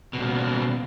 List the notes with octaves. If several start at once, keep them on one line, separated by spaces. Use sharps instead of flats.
D#2 B2